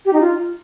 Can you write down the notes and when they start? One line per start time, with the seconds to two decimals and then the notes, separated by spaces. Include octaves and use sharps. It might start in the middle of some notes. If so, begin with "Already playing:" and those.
0.05 G4
0.13 D#4
0.21 F4